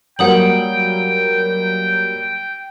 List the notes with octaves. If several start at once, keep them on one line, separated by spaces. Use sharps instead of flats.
F#3 G3 A#3 F#5 G5 D#6 F#7